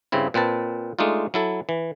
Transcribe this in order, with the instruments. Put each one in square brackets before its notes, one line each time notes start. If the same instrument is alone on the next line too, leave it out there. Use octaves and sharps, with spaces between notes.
[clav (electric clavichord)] G2 C#3 C4 E4
A#2 C4 B4 A5
G#3 A3 D4 D#4 F4
F#3 E4 A4
E3